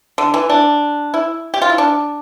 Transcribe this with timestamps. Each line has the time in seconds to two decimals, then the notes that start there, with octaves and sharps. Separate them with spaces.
0.18 D3
0.34 E3
0.49 D4
1.14 E4
1.54 G4
1.62 F4
1.70 E4
1.78 D4